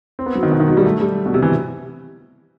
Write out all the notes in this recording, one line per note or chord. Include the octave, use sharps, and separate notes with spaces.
C4
B3
F#3
D#3
B2
D#3
F#3
G3
A3
G3
B2
C3
E3